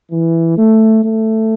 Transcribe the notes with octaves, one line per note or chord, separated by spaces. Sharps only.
E3
A3
A3